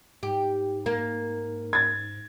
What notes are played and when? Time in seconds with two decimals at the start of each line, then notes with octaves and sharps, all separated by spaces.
0.23 G#2 G4
0.86 A#3
1.73 G#6 A6